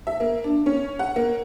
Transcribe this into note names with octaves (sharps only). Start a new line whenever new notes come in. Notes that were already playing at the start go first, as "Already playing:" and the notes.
E5
A#3
D4
C#4
F#5
A#3